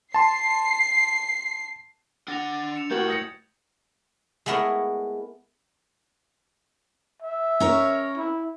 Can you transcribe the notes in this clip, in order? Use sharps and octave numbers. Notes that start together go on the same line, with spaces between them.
A5 C6 C7
D4 F#5 A6 A#6 F7
C#7 E7 F7
A3 E4 F#4 G4 A#4 G6 G#6 F#7
D#6 A#6 C#7
G#3 A3 B3 E4 A#4 C#5
E5
C#4 A#4 C#5
E4